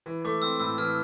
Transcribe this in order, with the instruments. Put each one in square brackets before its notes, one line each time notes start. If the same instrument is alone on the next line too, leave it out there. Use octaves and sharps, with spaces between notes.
[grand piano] E3
[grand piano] A3 [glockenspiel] D6
[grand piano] C4 [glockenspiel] E6
[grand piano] A2 [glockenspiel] E6
[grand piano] E3 [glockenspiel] F6